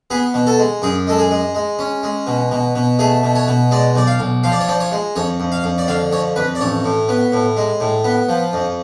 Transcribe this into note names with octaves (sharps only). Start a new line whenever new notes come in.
B3 G#4
B2
A4
G#3
F#2 G#4
G#3 A4
G#4
G#3
G#3
C#4
G#3
B2
B2
B2
A3 G#4
B2
C#5
B2
G#3 D5
B1 D5
F5
B1
F3 F5
D5
C#5
F3 D5
C#5
G#3
F2 C#5
F2
F5
F2
D5
D3 F5
F2 C#5
F2 B4
D5
A1 C#5
A2
B3
A2
G#3
A2
B3
F3
F2